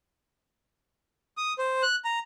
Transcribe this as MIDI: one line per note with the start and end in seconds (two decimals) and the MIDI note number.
1.37 1.53 87
1.58 1.82 72
1.83 1.96 90
2.05 2.19 82